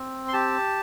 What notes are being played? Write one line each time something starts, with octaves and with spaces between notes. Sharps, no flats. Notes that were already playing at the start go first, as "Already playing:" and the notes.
Already playing: C4
C6
G4 A5